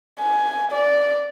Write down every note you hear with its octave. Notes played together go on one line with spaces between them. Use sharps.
G#5
D5